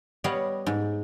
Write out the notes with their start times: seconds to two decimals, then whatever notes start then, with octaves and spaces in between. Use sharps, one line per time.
0.24 G3 B3 C#5 D#5 F5 F#5
0.67 G#2